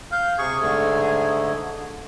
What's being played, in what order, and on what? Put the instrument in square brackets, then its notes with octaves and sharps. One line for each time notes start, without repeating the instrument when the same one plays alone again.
[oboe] F5 [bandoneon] G6
[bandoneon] C3 C#6 [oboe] G#4
[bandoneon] G#2 D3 A3